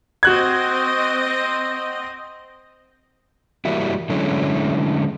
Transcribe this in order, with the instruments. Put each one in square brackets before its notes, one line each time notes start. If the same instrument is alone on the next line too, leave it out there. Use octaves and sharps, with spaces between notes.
[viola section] C4 D#5 [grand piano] F#4 F#6 G#6
[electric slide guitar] E3 G3 A#3 E4 F#4
D3 F#3 G#3 A3 C#4 E4